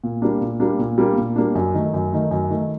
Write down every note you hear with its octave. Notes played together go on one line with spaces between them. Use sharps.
A#2
G3 A#3 D4
A#2
G3 A#3 D4
A#2
G3 A#3 D4
A#2
G3 A#3 D4
F#2
D#3 A3
F#2
D#3 A3
F#2
D#3 A3